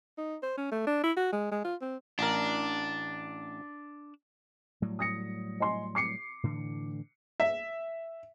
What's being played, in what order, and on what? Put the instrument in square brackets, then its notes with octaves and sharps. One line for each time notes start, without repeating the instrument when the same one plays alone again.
[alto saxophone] D#4
C5
C#4
A3
D4
E4
F#4
G#3
G#3
F4
C4
[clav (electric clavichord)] A1 A#4 [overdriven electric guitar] D4
[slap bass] A2 F#3 G3
[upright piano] D#6 A#6 C#7
D#5 G#5 C6
D6 C7 C#7
[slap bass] A2 D3 E3
[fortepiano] E5